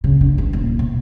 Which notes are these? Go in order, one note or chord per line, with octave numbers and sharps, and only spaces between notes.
C#3
D3
E3
D#1
B2